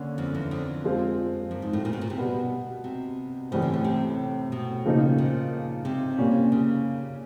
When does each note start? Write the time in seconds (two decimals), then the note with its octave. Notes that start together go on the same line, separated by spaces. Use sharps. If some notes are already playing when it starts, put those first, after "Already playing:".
Already playing: D3 A#3 C#4
0.18 F2
0.34 E2
0.51 F2
0.84 F3 G#3 C4 F4
1.51 F#2
1.62 G#2
1.73 A2
1.85 A#2
1.93 B2
2.01 A#2
2.10 C3
2.18 B2 G3 B3
2.84 C3
3.51 A2 C#3 E3 G3 C4
3.62 D3
3.73 C#3
3.84 C3
4.52 B2
4.85 C#3 F3 A#3 D#4
5.18 A#2
5.85 C3
6.18 A#2 G3 A#3 C#4
6.52 C#3